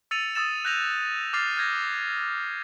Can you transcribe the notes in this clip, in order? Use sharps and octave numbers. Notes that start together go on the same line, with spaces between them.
E6 A6 C#7 D#7 F7
D#6 E6 A6 E7
F#6 G6 A#6 D#7 F7
D6 F6 A6 C7 F7
F6 G6 G#6 A#6